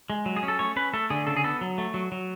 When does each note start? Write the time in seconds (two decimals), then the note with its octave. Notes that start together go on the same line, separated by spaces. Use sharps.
0.10 G#3
0.26 F#3
0.36 G#4
0.43 C#4
0.48 A4
0.59 A3 C#5
0.76 C#4 B4
0.93 A3 A4
1.10 D3 G#4
1.27 C#3 A4
1.37 G#4
1.44 B3 A4
1.61 F#3
1.78 A3
1.94 F#3
2.12 F#3